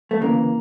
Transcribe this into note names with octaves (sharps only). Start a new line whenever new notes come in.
A3
D2 C#3 E3 A#3